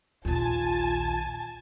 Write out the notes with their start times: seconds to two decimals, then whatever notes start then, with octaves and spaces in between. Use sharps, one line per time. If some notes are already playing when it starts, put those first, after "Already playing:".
0.25 A#1 D#2 F4 G#5 A5